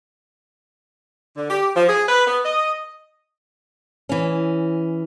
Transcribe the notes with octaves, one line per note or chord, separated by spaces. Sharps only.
D3
G4
F3
G#4
B4
B3
D#5
E3 C#4